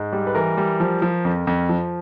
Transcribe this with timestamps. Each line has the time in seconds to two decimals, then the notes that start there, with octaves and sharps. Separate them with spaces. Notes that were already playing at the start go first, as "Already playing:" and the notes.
Already playing: G#2
0.13 G3
0.27 B4
0.35 E3 A#4
0.57 G3
0.80 F3
1.02 F3
1.25 F2
1.47 F2
1.69 F3